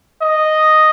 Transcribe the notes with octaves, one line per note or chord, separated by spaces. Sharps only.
D#5